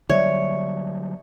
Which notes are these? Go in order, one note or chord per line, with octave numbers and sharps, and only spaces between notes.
D3 F#3 G3 C#5 D5 E5